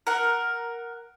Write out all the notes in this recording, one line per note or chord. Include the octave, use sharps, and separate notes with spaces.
A#4 F#5